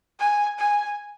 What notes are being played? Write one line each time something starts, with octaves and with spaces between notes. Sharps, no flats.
G#5
G#5